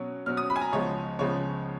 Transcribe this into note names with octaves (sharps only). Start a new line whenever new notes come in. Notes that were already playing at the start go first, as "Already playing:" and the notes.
Already playing: B2 F#3 C#4
B2 F#3 C#4 F6
D#6
B5
G#5
A#5
C#2 C#3 F3 G#3 B3 C#5
C#2 C#3 F3 G#3 B3 C#5